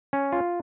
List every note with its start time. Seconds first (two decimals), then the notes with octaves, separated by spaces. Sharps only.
0.13 C#4
0.32 F4